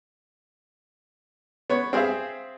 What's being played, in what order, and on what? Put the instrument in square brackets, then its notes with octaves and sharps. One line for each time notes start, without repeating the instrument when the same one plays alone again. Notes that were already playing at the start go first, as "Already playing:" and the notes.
[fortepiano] B3 C#5
C4 G#4 C5 E5 F5